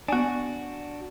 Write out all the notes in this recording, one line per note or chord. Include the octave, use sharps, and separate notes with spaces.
B3 D4 F#4 G#5